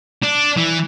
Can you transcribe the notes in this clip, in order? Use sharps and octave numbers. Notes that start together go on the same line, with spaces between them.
D4
E3